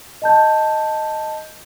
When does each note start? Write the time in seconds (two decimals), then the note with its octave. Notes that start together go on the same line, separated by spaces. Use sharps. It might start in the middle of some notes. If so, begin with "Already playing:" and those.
0.22 D#5 A5 G6